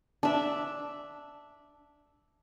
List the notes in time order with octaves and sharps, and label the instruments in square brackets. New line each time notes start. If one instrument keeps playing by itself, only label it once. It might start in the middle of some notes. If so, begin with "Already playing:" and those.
[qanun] D4 E5